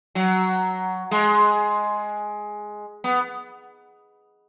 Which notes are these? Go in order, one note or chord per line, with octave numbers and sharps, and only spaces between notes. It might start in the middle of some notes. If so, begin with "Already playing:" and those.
F#3
G#3
B3